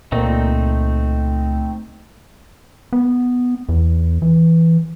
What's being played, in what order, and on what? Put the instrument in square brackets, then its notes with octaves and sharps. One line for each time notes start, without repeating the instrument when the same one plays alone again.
[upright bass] C#2 [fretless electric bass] A#2 [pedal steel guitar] A3 C4 D#4
[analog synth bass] B3
E2
E3